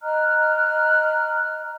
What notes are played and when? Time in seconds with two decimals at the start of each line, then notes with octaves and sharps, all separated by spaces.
0.01 D#5 A#5 F6 F#6